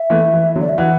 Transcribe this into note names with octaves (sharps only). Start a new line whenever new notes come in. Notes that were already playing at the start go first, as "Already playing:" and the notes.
Already playing: E5
E3 A3
E3
D3 F#3
D5
E5
E3 F#5